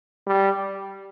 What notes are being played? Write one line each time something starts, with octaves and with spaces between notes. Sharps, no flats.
G3